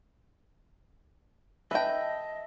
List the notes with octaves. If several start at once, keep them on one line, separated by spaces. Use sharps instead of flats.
B4 D#5 E5 G5 A5